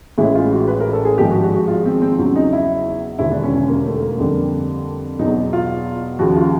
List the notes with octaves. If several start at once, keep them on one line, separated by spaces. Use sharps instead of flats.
A1 A2 E3 G#3 E4
F4
F#4
B4
A#4
A4
G#4
G#1 G#2 F3 G#3 G4
F#4
F#4
F#4
F4
C4
C4
E2 C#3 F#3 C#4
D#4
E4
E1 D#2 D3 E4
D4
C#4
C#4
A#3
A3
A#3
F2 D3 G3
E2 B2 F#3 D#4
F4
D#2 C#3 F3 F#4
F4